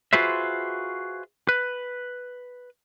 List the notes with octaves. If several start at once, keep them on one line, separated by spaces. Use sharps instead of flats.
F4 F#4 G#4 B4 C5 E5
B4